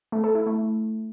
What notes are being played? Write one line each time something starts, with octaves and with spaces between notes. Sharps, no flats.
A3
A4
E4
A3